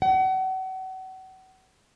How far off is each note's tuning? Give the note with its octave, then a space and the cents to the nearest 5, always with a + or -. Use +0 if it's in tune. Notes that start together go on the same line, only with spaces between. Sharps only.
F#5 +35